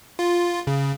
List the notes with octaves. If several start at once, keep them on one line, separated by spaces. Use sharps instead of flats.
F4
C#3